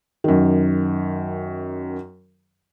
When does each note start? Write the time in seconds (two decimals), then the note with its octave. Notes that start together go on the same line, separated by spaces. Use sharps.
0.24 F#2 D#3